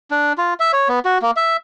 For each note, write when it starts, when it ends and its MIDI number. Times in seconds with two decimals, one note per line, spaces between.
0.11 0.33 62
0.38 0.54 65
0.60 0.72 76
0.73 0.88 73
0.88 0.99 59
1.05 1.18 66
1.22 1.31 58
1.36 1.57 76